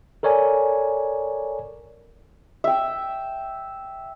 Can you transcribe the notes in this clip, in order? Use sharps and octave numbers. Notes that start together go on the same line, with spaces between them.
A4 A#4 C#5 D5 G#5
E5 G5